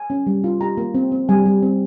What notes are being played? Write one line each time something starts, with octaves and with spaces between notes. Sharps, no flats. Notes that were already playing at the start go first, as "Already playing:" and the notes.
Already playing: G#5
C#4
G3
F4
G4 A#5
A#3
C4
C4
G3 G#5
G3
C4